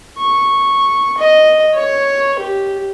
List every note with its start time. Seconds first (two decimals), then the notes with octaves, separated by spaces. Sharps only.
0.18 C#6
1.17 D#5
1.75 C#5
2.39 G4